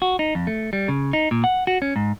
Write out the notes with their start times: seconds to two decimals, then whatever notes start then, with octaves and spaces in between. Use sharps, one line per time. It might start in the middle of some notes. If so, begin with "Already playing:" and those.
0.02 F#4
0.19 D#4
0.35 F2
0.47 A3
0.73 G3
0.88 C#3
1.13 D#4
1.31 A#2
1.44 F#5
1.67 F#4
1.82 C#4
1.96 G#2